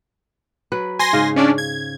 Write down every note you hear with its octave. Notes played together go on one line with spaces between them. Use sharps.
F#3 B4
C5 G#5 C6 A#6
G#2 C#3 F5
C#4 D4 D5
G#6